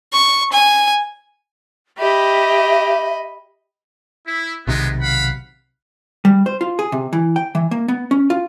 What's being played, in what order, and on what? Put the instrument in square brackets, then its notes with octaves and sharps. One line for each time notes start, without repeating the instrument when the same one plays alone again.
[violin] C#6
G#5
[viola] G4 [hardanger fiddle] D#5 B5 [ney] E5
[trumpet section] E4
[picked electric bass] B1 C3 D#3 [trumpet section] G3 G#3 B3
[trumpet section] F5 F#5 B5
[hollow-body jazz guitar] G3
C5
F4
G#4
C3
E3
G5
E3
A#3
B3
C#4
F4